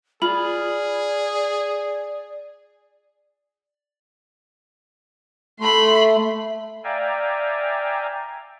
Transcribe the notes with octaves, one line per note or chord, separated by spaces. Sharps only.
F4 G#4 D5 B5
A3 B5 C6
D5 E5 F5 G5 G#5 A#5